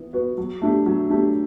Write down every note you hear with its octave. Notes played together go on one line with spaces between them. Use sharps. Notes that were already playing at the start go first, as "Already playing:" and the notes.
Already playing: E3 B3
B3 F#4 B4
F#3
A3 D4 G4
F#3
A3 D4 G4